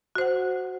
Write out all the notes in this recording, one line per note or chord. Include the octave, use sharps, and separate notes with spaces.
F#4 C5 F#5